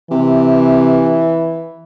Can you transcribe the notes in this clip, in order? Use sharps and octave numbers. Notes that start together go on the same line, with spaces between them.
C3 E3